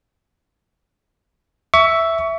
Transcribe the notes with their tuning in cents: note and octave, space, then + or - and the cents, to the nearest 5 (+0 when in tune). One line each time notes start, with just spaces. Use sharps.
E5 +0 C#6 +25